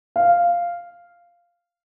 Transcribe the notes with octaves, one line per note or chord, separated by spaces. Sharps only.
F5